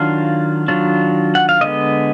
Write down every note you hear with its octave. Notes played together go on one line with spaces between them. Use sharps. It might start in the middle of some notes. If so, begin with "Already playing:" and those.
Already playing: D#3 F#3 D4 F4 F5
D#3 F#3 D4 F4
F#5
F5
D3 G#3 B3 D#5